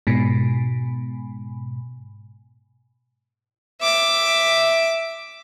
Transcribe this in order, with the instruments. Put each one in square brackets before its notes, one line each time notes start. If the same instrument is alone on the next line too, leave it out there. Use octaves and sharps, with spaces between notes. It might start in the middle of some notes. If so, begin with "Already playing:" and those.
[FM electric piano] G#2 B2
[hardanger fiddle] E5 D6